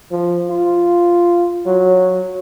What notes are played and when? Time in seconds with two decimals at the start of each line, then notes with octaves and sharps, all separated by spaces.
0.11 F3
0.51 F4
1.66 F#3